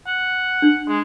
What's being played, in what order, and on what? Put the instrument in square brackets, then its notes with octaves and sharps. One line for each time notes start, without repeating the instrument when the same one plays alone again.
[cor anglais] F#5
[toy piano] D4
[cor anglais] G#3